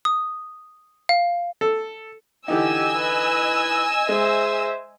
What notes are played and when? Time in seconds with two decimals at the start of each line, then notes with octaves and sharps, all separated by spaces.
0.05 D#6
1.09 F5
1.61 A4
2.48 D3 E3 D#4 G4 D#5 G#5 E6
2.96 B4
4.09 G#3 C5 E5